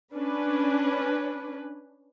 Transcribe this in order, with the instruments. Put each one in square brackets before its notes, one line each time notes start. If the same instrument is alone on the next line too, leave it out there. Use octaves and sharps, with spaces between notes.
[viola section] C#4 D4 B4